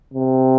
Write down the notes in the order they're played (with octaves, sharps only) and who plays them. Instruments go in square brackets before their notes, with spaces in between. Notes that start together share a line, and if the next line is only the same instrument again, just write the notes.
[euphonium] C3